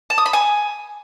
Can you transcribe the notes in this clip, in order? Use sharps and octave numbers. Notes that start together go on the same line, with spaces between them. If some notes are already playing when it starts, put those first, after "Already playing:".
A5
D#6
B5
G#5